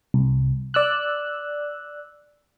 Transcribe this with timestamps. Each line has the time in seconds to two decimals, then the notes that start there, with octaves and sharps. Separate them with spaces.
0.14 C2
0.74 D5 E6 F#6